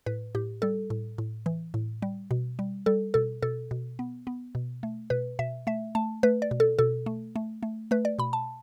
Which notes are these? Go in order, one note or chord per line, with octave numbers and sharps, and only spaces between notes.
A2 B4
A2 G4
G3 A4
A2
A2
E3
A2
G3
B2
G3
G3 A4
B2 A4
B2 A4
B2
B3
B3
B2
A3
B2 B4
B2 E5
A3 E5
A3 A5
A3 B4
D5
B2
A4
B2 A4
A3
A3
A3
A3 B4
D5
B2 B5
A5